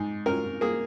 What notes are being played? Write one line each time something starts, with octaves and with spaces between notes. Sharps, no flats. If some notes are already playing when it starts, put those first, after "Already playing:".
Already playing: G#2
C#4 A#4
A#3 G#4